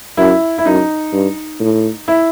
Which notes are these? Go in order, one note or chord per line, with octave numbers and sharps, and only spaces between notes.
F#2 E4
E4
F#2 D#4
G2
A2
E4